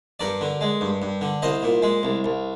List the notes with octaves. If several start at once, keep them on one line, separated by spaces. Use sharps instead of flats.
G2 A#4 D5
D3
G#3
G2
G2
D3
C2 C5 D#5
A#2
G#3
C2
C2